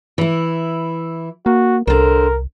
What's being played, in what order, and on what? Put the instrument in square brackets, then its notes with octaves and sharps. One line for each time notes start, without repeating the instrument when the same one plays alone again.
[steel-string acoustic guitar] E3 E4
[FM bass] A#3 [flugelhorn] F#4
[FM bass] C2 [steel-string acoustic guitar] D3 C5 [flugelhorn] A#4